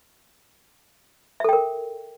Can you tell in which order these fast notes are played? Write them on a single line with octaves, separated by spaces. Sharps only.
E5 A4 G5 A#4